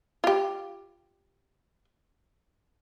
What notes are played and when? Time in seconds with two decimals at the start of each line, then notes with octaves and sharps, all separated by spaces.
0.24 F4 G4